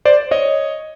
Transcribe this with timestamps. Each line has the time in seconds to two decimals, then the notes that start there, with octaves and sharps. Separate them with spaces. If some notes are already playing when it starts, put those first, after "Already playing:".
0.05 C5 D5
0.31 C#5 D#5